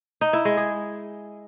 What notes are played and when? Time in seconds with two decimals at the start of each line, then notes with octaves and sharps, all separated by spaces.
0.21 D#4
0.33 E4
0.45 G#3
0.57 G#4